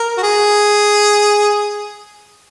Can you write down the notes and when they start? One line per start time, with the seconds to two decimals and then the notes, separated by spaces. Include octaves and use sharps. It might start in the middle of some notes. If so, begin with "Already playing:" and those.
Already playing: A#4
0.17 F#4
0.23 G#4